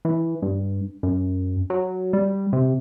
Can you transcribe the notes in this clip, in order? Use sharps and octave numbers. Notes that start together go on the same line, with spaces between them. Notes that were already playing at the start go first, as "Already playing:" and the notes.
E3
G2
F#2
F#3
G3
C3